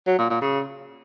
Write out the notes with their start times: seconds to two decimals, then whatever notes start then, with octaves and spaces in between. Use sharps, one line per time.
0.07 F#3
0.18 A#2
0.30 A#2
0.41 C#3